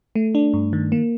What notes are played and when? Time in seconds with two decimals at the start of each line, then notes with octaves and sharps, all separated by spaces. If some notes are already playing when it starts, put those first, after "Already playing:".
0.15 A3
0.35 D4
0.53 G2
0.73 D#3
0.92 A#3